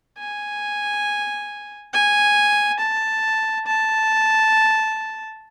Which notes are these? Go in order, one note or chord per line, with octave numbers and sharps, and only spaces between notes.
G#5
G#5
A5
A5